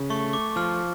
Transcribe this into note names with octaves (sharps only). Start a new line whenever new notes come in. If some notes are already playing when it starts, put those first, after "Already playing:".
Already playing: C#3
A3 C#6
D6
F3 F6